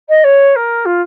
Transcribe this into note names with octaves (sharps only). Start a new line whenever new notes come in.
D#5
C#5
A#4
F4